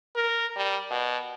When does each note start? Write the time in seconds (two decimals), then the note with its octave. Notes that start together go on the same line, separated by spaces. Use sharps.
0.15 A#4
0.56 G3
0.91 B2